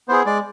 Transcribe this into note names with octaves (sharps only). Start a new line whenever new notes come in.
B3 E4 G#4 C5
G#3 D5